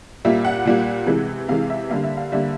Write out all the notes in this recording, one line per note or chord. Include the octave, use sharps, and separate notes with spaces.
A#2 G3 A#3 E5
F#5
A#2 G3 A#3
C3 E3 G#3
C3 E3 G#3 F5
E5
D3 G3 A#3 F5
E5
F5
D3 G3 A#3 E5